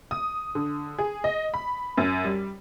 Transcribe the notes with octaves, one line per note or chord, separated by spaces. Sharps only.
D#6
D3
G#4
D#5
B5
F#2
G3